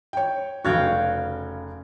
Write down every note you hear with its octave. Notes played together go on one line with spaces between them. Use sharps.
C#5 G5
F1 C#3 F#4 F5 G5 G#6